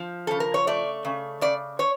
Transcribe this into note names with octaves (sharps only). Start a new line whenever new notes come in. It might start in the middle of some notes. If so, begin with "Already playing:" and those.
Already playing: F3
C#3 A4
A#4
C#5
A3 D5
C#3
C#3 D5
C#5